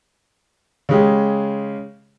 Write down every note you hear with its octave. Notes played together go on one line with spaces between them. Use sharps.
C#3 G#3 G4